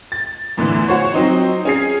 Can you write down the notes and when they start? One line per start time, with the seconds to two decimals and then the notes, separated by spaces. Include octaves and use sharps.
0.12 A6
0.57 E2 A2 D3 E3
0.88 F#4 C5 C#5
1.14 F#3 C4 D#4
1.65 C#4 G#4 C7